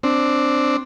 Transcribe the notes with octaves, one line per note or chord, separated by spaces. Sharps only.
C4 D4